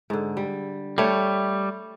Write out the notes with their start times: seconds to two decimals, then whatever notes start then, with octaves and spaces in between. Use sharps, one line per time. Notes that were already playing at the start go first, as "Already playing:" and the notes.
0.10 G#2 D3
0.37 G3
0.98 G3 A3 C#5